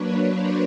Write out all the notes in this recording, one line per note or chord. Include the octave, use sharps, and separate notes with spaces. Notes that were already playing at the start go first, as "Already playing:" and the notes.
Already playing: F#3 A#3 D4 B4 C#5
C5 D5